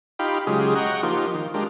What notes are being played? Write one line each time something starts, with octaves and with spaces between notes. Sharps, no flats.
D#4 F4 G4 F5 G5 B5
C#3 F#3 G#3 F4 G4 G#4
D#5 F#5 G5 A#5 C#6
F3 A#3 D#4 F4 G4
D#3
G#3 D4 F4 G4 A#4